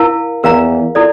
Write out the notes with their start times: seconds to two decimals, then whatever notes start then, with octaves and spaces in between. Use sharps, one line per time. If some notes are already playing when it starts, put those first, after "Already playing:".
Already playing: E4 A#4 F5 A5
0.44 E2 A#4 F5 A#5
0.95 E4 A4 D5